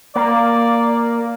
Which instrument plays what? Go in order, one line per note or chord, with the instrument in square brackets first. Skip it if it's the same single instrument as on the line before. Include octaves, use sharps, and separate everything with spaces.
[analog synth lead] A#3 [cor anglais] D5